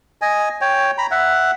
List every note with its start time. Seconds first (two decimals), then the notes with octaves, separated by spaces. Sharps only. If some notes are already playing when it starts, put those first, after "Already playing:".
0.22 D#5 G#5
0.61 C#5 G5
0.98 A#5 B5
1.11 E5 F#5